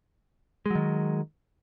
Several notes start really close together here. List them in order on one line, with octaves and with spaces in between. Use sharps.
G#3 F#3 D#3